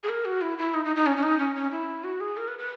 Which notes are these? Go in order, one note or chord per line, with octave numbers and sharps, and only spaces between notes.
G#4
A#4
F#4
E4
E4
D#4
D#4
D#4
C#4
C#4
D#4
C#4
C#4
E4
F#4
G#4
A#4
B4
B4